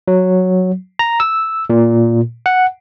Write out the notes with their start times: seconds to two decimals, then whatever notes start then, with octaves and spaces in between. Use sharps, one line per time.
0.08 F#3
0.99 A#5
1.20 E6
1.70 A#2
2.46 F#5